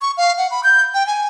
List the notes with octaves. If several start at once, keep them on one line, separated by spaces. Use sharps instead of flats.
C#6
F5
F#5
B5
G6
G5
G#5